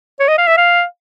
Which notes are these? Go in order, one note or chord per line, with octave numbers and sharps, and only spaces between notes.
C#5
D#5
F5
E5
F5